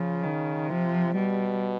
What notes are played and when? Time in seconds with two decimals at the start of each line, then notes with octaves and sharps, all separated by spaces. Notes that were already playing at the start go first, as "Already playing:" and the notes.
Already playing: C#3 F3
0.23 D#3
0.69 C3 F3
1.15 B2 G3